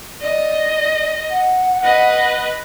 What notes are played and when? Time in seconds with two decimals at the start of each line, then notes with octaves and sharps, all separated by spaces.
0.21 D5 D#5
1.30 F#5
1.83 B4 D#5